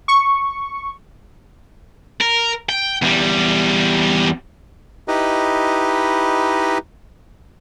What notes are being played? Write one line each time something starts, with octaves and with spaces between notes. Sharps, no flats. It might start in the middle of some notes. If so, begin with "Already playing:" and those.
C#6
A#4
G5
E2 G3
D#4 E4 G4 B4 D#5